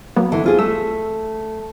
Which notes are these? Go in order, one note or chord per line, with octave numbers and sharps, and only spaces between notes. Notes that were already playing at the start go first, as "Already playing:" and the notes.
F#3 A#3 B3
D3 E3
C4 F4 G#4
A3 E6